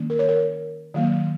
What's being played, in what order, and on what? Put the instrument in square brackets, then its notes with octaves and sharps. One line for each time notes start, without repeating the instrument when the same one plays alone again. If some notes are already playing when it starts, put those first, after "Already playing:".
Already playing: [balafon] D#3 A#3 C#4
A#4
C#5
A#4
D#3 F#3 A#3